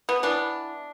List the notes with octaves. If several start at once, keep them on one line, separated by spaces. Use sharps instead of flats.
B3
E3 B3 D4